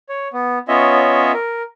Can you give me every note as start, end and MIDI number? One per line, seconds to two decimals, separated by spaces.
0.09 0.28 73
0.33 0.59 59
0.68 1.32 59
0.68 1.32 61
0.68 1.32 65
0.68 1.32 73
0.68 1.32 75
0.68 1.32 76
1.33 1.63 70